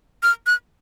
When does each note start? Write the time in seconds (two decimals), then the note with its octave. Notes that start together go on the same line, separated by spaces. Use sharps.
0.23 F6
0.47 F#6